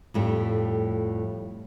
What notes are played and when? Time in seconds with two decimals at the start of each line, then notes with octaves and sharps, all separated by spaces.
0.14 F2 A2 G3